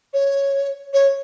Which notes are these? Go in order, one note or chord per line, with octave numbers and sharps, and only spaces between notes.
C#5
C#5